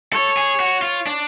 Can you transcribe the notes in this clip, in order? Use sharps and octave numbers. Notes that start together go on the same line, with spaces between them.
A4 C#5
G#4
F#4
F4
D4